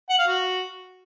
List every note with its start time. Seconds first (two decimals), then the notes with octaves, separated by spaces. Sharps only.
0.10 F#5
0.19 F5
0.28 F#4